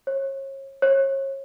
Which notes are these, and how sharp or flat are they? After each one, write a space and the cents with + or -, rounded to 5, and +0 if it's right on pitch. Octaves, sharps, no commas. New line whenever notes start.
C#5 -35
C#5 -35